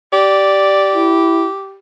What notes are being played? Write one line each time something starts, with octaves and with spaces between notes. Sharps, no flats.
G4 D5
E4